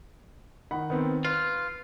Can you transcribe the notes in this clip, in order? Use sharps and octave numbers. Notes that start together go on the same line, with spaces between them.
D#3 F#5 B5
D#3 B3 C4
F4 B4